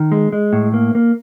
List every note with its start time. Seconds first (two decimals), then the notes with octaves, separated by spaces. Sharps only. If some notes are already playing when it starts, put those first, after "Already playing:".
Already playing: D#3
0.12 G#3
0.33 G#3
0.53 A2
0.74 A#3
0.95 A#3